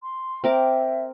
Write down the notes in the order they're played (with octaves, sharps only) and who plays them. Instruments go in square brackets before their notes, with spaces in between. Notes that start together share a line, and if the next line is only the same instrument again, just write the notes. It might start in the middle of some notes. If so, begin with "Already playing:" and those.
[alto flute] C6
[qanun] C4 A#4 D6 [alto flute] E5